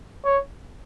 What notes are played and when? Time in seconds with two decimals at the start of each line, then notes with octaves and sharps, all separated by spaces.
0.25 C#5